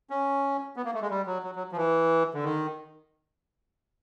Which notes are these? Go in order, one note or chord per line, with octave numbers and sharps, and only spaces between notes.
C#4
B3
A#3
A3
G#3
G3
F#3
F#3
F#3
F3
E3
D3
D#3